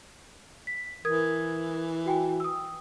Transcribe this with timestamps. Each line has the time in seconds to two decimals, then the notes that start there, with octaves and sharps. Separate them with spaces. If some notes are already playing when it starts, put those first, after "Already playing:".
0.67 B6
1.05 E3 A#4 D#6 G#6
2.06 F#4 G5 G#5
2.40 D#6 E6